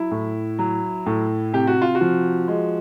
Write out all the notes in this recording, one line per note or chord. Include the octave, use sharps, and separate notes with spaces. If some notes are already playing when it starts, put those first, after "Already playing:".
Already playing: F#3 E4
A2
F#3
A2
C3 G4
F#4
F4
F#4
F3
G#3